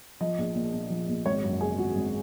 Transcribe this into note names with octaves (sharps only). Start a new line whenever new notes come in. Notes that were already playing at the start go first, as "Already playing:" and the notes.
F3 D#5
A#1
A#2
A#2
F3
A#1
G#1 C#5
F#2
C#3 G#4
G#1 F#4
G#1